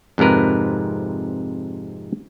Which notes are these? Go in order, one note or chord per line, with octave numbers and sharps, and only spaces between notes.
F2 G#2 C3 A#4 B4